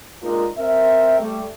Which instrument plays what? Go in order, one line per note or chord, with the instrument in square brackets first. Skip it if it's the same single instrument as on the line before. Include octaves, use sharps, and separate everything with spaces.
[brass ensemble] G#3 A#3 D4 D#4 F4 A#4
C4 A#4 E5
G3 A3